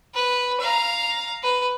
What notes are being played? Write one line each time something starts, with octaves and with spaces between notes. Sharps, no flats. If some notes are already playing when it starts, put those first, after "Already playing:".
B4
F5 A#5
B4